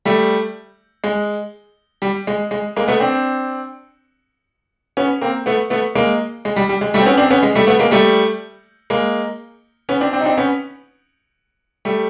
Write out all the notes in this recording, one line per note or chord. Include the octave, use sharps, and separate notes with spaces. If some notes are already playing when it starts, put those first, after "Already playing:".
G3 A3
G#3
G3
G#3
G#3
G#3 A#3
A3 B3
C4 D4
B3 C#4
A#3 C4
A3 B3
A3 B3
G#3 A#3
G#3
G3
G3
G#3
G3 A3
C4
B3 C#4
C4 D4
B3 C#4
G#3
G3 A3
A3 B3
G#3 A#3
G3 A3
G#3 A#3
B3 C#4
C4 D4
C4 D4
D#4
C4 D4
B3 C#4
G3 A3